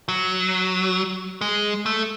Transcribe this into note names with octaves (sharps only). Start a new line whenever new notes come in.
F#3
G#3
A3